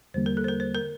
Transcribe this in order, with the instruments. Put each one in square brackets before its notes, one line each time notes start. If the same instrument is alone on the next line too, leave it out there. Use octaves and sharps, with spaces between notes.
[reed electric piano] E2 D3 G3 A#3 [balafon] C5
[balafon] A#4
A4
C5
A#4
C5
A#4